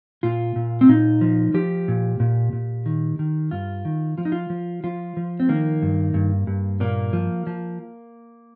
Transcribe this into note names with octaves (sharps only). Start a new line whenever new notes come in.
A#2 F4
A#2
C4
A#2 D#4
F3
F3 G4
A#2
A#2
A#2
D#3
D#3
G2 F4
D#3
F3 F4
D#4
F4
F3
F3 F4
F3
C4
D#3 A#3
G2
G2
G2
A#2 A#3
F3
F3